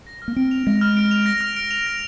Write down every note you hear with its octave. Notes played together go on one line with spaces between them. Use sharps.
A#6
F6
A#3
C4 D7
F7
G#3 A#6
F6
D7
F7
A#6
F6
D7
F7
A#6